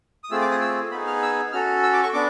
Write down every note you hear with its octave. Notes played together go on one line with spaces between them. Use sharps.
D#6
A3 C4 F4 G#4 E6
D6
D#6
E6
B3 D#4 G#4 B5
F6
E6
C#4 F#4 A4 F6
E6
D6
C#6
B3 D4 D6